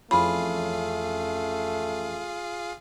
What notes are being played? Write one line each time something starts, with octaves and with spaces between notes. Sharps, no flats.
F2 E3 A3 C#4 F4 G#4 F5 B5